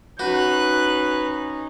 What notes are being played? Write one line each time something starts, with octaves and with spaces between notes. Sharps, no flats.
C#4 D#4 F#4 B4 F#6